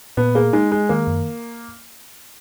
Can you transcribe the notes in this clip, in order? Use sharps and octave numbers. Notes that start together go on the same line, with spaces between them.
A#2 B3
A#3 G#4
G#3 D#4
G#3 G#4
D#3 A#3
F#2